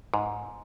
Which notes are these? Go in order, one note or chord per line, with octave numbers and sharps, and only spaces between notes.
G#2